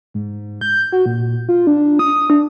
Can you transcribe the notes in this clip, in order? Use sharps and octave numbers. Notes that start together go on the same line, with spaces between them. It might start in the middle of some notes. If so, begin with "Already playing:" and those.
G#2
G6
F#4
A#2
F4
D4
D#6
D4